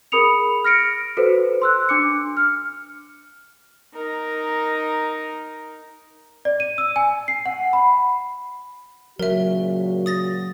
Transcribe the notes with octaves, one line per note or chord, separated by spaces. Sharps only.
G#4 A#4 B5 D#6 C#7 F7
F6 A#6 C#7 D7
F#4 A4 B4 C5
C6 E6 F#6
D4 D6 C#7
F6
D#4 A#4
D5
D#7
E6
G#5
C7
F#5
B5
A#2 C#3 F#3 F#4 A#4 E5
D#6 A6 A#6